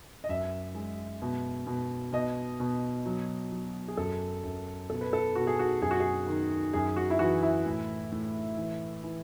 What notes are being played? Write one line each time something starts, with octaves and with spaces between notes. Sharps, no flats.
D#5
F#2 E5
G#3
B2
B2
B2 D#5
B2
F#3
F#3
G#4
F#2 A4
F#2
B2 A4
B4
A4
B2 F#4
G#4
F#4
F#2 G#4
F#4
G#4
D#3
F#2 G#4
F#4
E4
E3 F#4
E4
A2
A2
E3
E3